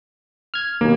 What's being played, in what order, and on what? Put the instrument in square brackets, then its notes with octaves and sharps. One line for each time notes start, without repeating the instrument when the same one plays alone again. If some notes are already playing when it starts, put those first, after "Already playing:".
[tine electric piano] F6 G#6
[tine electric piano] D#2 B2 [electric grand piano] A#3